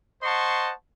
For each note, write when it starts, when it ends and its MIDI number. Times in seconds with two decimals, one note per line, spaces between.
0.23 0.71 72
0.23 0.71 75
0.23 0.71 78
0.23 0.71 81
0.23 0.71 84
0.23 0.71 85